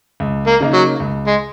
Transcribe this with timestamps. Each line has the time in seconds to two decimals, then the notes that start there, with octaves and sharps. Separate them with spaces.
0.20 C#2
0.47 A#3
0.61 C#3 A#3 D#4
0.74 F#3
1.00 C#2
1.27 G#3